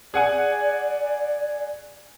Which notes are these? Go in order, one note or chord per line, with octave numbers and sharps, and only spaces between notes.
G#4 D5 F#5 G#5